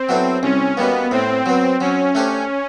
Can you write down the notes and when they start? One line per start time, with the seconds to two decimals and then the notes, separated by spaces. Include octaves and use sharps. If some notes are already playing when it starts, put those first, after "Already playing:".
Already playing: C4
0.09 F#3 B3 E4 A4
0.42 C2 C#4
0.77 B2 G3 A#3 B3
1.11 A2 C4
1.46 F#3 B3
1.81 F#3 C#4
2.15 A3 D4 G4 C5